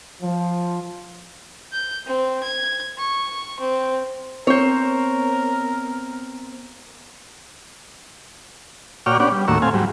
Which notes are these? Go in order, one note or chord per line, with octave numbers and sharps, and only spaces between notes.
F3
G6
C4
G#6
C#6
C4
B3 C4 A#4 C5 C#5
A#2 F#4 C#5 D5 G5 F6
B3 C#4 D4 G4 D5 F#5
G3
D#2 A2 A#3 F#4 C#6 E6
A3 C4 F5 G#5
G#2 F#3 G3